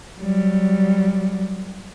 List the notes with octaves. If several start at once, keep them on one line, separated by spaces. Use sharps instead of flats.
F#3 G3